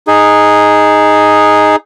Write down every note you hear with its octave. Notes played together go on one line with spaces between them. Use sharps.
D#4 G#4